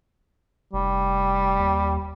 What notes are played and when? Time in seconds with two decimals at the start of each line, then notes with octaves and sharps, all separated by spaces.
0.73 F1 G3
1.59 D#2